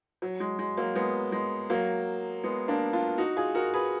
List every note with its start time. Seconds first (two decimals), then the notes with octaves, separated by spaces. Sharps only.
0.22 F#3
0.40 G#3
0.59 G#3
0.77 F#3 A#3
0.95 G#3 B3
1.32 G#3
1.70 F#3 A#3
2.44 G#3 B3
2.68 A#3 D4
2.93 D4 F4
3.18 D#4 F#4
3.37 F4 G#4
3.55 F#4 A#4
3.74 G#4 B4